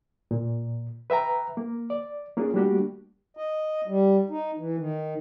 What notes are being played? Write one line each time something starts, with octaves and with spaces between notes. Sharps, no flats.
A#2
B4 E5 G5 A#5
A#3
D5
A#3 C#4 D4 F4 G#4
G3 A3 A#3 D4 F#4 G4
D#5
G3
D#4
E3
D#3